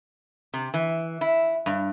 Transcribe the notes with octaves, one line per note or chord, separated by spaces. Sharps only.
C3
E3
E4
G2